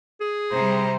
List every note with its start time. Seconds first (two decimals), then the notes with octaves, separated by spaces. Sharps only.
0.21 G#4
0.51 C3 G3 C5 A#5